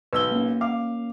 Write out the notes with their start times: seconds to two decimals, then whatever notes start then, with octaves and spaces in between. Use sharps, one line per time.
0.13 B1 B4 E6 G7
0.31 A#3 C#4
0.61 F5 D6